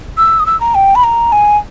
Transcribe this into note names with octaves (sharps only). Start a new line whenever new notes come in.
E6
D#6
E6
A#5
G5
B5
A#5
G#5